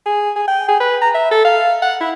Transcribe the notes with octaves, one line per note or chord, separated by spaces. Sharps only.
G#4
G#4
G5
G#4
B4
A#5
E5
A4
F5
F#5
E4